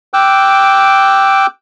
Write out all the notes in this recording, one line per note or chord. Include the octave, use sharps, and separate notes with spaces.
G5 D6 E6 F#6